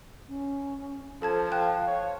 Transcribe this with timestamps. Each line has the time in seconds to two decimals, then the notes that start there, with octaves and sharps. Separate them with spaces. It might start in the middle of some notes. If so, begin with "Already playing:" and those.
0.29 C#4
1.22 F3 A4 C5 A5 G#6
1.52 F5 G5 A5 F#6
1.87 C#5